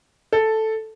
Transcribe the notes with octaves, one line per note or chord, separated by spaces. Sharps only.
A4